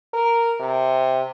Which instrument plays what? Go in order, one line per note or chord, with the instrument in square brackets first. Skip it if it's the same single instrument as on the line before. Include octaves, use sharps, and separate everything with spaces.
[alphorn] A#4
C3